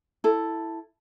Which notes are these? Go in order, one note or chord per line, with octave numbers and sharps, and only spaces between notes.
E4 A4